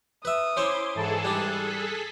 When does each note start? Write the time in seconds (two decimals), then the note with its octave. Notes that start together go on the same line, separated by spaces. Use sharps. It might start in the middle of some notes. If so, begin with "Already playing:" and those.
0.25 B4 E5 D#6
0.57 C#4 E4 C5 C#5 C6 D6
0.95 G#2 E3 G#4 A4 A5
1.25 G3 D4 F#6
1.65 B6